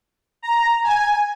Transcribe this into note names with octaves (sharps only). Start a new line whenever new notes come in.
A#5
G#5